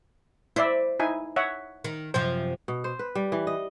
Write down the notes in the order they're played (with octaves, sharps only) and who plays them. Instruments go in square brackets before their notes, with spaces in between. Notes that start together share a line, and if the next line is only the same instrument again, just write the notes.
[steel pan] E4 D5 E5 [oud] C5
[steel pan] D#4 E4 G#5
C#5 E5 F#5
[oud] D#3
[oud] F#2 C3 F3 [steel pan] C5
[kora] B2
C5
B4
G3
E3
D#5